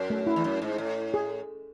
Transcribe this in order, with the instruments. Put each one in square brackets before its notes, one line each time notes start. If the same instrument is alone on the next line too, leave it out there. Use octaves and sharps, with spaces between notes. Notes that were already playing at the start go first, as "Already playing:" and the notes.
Already playing: [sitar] F#2
[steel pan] A3
E4
[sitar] E2
F#2
G#2
A2
[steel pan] G#4